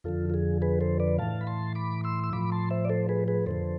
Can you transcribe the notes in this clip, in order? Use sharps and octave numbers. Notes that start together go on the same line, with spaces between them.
F2 D3 F3 F4 A4
F4
G#4
G#4 B4
A4 C5
B4 D5
A2 E3 F5 A5
B5
A5 C6
B5 D6
C6 E6
E6
A2 F3 B5 D6
A5 C6
C5 E5
D5
A4 C5
G#4 B4
G#4 B4
F2 D3 F3 A4 C5